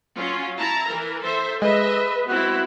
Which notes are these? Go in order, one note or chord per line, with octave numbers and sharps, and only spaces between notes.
F#3 C#4 F4
E4 A5 A#5
E3 A#4
A4 C5 E5
G#3 B4 D#5 E5
B3 C4 E4 F#4